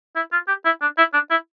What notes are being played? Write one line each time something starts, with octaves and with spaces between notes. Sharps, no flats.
E4
F4
G4
E4
D4
E4
D4
E4